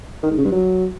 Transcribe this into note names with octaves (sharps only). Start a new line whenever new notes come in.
D#3
G#2
C#3
G2
F#3